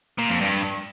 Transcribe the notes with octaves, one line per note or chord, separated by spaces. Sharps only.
A#2
F2
G2